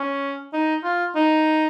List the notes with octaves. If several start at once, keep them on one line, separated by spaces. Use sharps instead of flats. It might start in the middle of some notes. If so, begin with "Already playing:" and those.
Already playing: C#4
D#4
F4
D#4